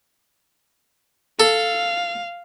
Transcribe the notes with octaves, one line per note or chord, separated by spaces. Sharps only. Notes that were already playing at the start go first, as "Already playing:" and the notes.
A4 F5